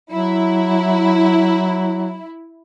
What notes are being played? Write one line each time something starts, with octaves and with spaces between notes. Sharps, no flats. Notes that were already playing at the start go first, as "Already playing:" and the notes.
F#3 E4